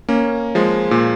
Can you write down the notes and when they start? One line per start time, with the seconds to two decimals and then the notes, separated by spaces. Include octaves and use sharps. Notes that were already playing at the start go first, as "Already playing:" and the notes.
0.09 A#3 C#4
0.55 F3 G#3
0.91 A#2